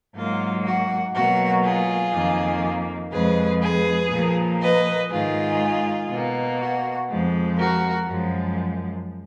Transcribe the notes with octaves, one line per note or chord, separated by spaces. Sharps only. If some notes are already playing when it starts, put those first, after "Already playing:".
G#2 F#3 A#3 F4
F#4
B2 F#3 A#3 F#4
F4 G#4
F2 D#3 A#3
F2 F3 G#3 G#4 B4
G#4 B4
A#2 F3 A#3
B4 D#5
G#2 D#3 G#3 F4 G#4
B2 A#3
F#4
F2 F3 G#3
F#4 A#4
F#2 F3 G#3